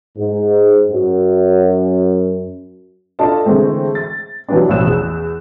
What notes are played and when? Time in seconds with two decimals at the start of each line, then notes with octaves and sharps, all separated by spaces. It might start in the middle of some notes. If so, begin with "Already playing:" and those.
0.17 G#2
0.91 F#2
3.19 D4 F4 A4 D5 D#5 A5
3.45 D3 E3 G#3 A3 C4
3.95 A6
4.49 E3 F#3 G3 B3 D4
4.69 A1 B2 F3 E6 F#6 E7
4.85 E2